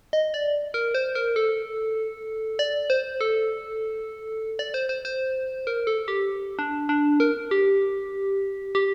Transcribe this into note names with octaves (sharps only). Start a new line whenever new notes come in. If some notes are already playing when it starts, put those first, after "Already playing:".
D#5
D5
A#4
C5
A#4
A4
D5
C5
A4
D5
C5
C5
C5
A#4
A4
G4
D4
D4
A#4
G4
G4